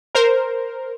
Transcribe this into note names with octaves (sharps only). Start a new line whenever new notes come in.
A#4 C5